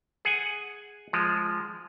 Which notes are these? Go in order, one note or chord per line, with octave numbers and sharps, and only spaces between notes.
G#4 F#5 G#5
F3 G#3